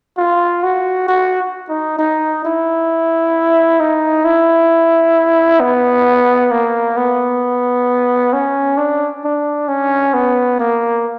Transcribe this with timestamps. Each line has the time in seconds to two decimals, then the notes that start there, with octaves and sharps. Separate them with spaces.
0.17 F4
0.63 F#4
1.08 F#4
1.69 D#4
1.99 D#4
2.45 E4
3.80 D#4
4.25 E4
5.60 B3
6.51 A#3
6.97 B3
8.33 C#4
8.77 D4
9.24 D4
9.68 C#4
10.14 B3
10.59 A#3